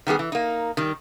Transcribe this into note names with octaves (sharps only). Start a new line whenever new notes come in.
D#3 G3 B3 G#4
E3
A#3 D#4
D#3 G3